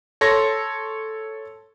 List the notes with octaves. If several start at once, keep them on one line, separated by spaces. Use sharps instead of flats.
A4 C#5 C6 A#6